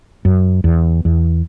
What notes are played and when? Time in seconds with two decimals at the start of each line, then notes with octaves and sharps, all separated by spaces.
0.25 F#2
0.64 E2
1.05 E2